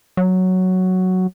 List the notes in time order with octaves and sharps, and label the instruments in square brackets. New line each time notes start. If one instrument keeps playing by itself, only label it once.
[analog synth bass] F#3